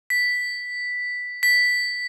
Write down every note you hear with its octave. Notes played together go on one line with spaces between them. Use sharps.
B6
B6